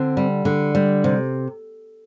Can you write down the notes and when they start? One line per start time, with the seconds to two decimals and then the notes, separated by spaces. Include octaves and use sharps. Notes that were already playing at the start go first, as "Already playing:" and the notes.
Already playing: D3 C4
0.17 G3
0.45 D3
0.75 G3
1.04 C3